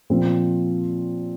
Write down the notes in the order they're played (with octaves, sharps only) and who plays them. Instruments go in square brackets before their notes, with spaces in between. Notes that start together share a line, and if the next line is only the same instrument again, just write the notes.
[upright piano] A#2 F3 C4 F4